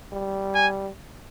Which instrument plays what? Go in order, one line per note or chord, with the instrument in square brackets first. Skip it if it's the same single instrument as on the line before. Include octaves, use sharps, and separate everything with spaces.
[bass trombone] G3
[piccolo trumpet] G#5